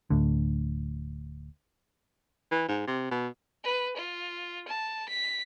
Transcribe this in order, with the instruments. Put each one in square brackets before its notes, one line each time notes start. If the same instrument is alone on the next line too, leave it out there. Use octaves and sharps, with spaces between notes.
[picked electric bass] D1 D2 D3
[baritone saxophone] E3
G#2
C3
B2
[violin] B4
F4
A5
B6